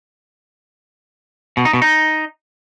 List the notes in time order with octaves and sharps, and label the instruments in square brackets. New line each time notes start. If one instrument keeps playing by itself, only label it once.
[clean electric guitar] B2
D#4
B2
D#4